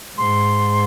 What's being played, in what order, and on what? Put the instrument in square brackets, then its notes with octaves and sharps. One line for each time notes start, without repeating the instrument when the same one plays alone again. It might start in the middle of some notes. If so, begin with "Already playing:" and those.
[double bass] G#2 [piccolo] C6